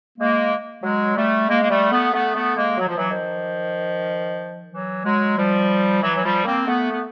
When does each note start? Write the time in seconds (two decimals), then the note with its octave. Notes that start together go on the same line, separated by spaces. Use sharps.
0.19 G#3 A#3
0.83 F#3 G#3
1.16 G3 A3
1.48 G#3 A#3
1.62 A#3
1.70 G3 A3
1.91 A3 B3
2.14 A3 B3
2.34 A3 B3
2.56 G#3 A#3
2.78 F#3
2.88 F3
2.97 E3 F#3
3.10 D#3 F3
4.72 E3 F#3
5.04 F#3 G#3
5.37 F3 G3
6.02 E3 F#3
6.16 F#3
6.24 F3 G3
6.45 A#3 C4
6.67 A3 B3
6.91 B3